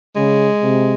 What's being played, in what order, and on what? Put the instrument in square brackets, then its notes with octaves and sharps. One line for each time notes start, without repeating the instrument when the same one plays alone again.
[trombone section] C#3 [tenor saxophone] G#3
[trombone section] C3